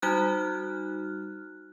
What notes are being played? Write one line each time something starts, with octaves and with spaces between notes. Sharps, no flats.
G3 D#4 F#4 F6 F#6